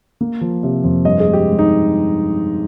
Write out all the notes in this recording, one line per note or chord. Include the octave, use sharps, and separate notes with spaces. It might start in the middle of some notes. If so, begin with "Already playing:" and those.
A#3
F3
C3
F2
G2 D#5
G#4
G#3
G4
G#3
D#4